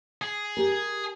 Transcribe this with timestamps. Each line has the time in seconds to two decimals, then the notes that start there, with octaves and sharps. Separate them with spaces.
0.22 G#4
0.57 G4 A#4